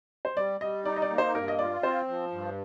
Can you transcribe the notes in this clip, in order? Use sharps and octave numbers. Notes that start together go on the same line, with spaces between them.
C5
G3 D5
G3 D#5
D#4 D5
D#5
D5
A#3
C5
G2 A#4
D#5
F4 D5
C4 C5
F3
G2